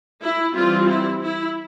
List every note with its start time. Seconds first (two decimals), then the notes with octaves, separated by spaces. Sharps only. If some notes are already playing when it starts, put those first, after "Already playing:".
0.22 E4
0.54 E3 G3 C4 F4
0.88 E4
1.21 E4